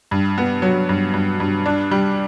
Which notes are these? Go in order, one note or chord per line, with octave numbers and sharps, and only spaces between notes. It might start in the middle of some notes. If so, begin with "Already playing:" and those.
G2
B3
F#3
G2
G2
G2
D4
G3